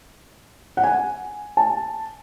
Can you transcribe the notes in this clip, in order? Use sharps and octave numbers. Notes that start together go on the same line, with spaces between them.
F#5
G#5
A5